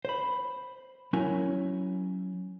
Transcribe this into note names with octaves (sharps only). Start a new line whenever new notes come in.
C5 B5
F#3 C#4 E4 A#4 G#5